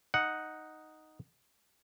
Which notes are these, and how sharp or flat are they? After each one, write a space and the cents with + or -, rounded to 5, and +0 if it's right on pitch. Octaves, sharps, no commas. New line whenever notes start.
D#4 +0 F#5 +0